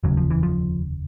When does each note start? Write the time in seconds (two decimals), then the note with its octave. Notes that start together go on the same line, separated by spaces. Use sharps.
0.03 F1 D#2 C#3 F#3
0.17 F3
0.30 E3
0.43 F3